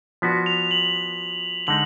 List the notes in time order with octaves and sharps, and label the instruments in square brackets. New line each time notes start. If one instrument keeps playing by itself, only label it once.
[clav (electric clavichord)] F3 B3 D4 F#4 [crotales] B6
[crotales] F7
F#7
[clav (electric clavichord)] D3 G#3 D#4 [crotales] F#7